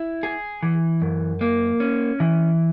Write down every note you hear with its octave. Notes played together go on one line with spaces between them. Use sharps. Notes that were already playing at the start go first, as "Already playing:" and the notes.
Already playing: E4
G#4
E3
F#2
A#3
C#4
E3